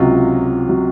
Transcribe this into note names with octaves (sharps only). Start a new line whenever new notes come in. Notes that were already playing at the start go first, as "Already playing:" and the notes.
Already playing: C#2 C3 F#3 F4
C3 F#3